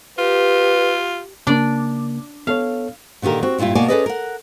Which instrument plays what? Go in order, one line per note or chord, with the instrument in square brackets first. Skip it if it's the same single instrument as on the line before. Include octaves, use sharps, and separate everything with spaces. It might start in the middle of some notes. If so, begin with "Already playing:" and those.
[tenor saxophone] F4 [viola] G4 [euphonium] B4
[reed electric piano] C#3 A#3 [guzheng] D4 D5
[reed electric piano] B3 A4 C#5 [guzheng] F5
[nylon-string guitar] A#2 D3 D#3 G4 A#4
C4 F#4
G2 A#2 G3 E4 F4
B2 A#3 D5 G#5 A5
C#4 G#4 A4 B4 D5 D#5
A#4 F#5